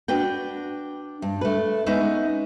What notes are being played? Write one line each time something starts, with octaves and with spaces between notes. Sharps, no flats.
D4 F#4 B4 G5
G2
A3 B4
G#3 B3 C#4 D#4 B4 E5